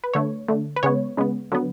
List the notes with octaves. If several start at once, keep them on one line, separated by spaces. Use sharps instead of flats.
B4
D3 A3 C#5
D3 A3
B4
C#3 G#3 B3 C#5
C#3 G#3 B3
D3 F#3 B3